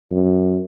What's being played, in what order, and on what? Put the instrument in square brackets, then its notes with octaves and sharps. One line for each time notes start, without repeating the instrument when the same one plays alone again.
[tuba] F#2